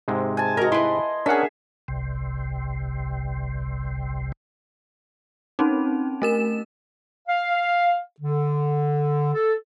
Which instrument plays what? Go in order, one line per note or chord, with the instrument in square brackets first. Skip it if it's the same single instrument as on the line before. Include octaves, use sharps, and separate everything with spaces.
[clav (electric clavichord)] G#2 C3 G#3
[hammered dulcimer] G#5 A5
[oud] F#4 A#4 [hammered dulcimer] D#5
[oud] E4 B4 [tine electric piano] C6
[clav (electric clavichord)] C#4 [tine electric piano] D4 A#4 F#5 [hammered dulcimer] G#4 E5
[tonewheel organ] G1 C2 C3
[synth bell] C4 C#4 D#4
A3 A#4 E7
[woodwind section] F5
D3
A4